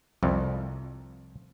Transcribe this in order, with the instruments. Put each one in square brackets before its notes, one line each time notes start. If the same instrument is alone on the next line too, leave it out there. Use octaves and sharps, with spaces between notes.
[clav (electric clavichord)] C2 F2